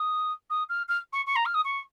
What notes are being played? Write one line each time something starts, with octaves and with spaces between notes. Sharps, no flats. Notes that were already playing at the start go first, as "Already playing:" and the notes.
Already playing: D#6
D#6
F6
F6
C#6
C#6
A#5
F6
D#6
C#6